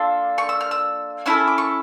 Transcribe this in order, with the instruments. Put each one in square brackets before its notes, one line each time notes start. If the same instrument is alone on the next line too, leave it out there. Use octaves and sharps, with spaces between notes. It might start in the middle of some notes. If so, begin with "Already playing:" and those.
Already playing: [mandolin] A#3 D4 F4 A4
C#6
E6
F6
E6
C#4 E4 A4 E6
D6
C#6